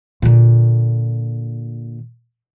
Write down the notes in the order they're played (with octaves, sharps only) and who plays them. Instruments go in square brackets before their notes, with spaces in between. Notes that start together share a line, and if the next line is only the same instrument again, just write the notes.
[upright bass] A#2 D3